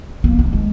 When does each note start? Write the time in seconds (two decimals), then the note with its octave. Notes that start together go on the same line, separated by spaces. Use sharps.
0.24 A#3
0.39 G#3
0.53 G#3